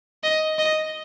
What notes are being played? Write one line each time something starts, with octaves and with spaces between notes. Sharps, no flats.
D#5
D#5